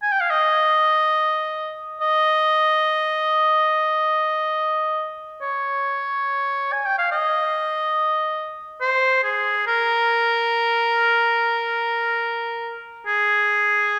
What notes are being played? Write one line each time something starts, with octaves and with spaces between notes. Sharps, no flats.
G#5
G5
F5
D#5
D#5
C#5
G#5
G5
F5
D#5
C5
G#4
A#4
G#4